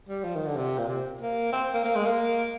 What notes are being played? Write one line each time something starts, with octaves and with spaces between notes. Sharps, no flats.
G3
F3
D#3
D3
C3
A#2
C3
A#3
C4
A#3
A#3
G#3
A#3